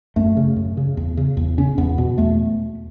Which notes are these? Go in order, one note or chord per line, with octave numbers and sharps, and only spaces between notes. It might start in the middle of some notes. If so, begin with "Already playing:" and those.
F#2 A3
C#3
F#2
C#3
E2
C#3
E2
C#3 C#4
E2 B3
B2
E2 A3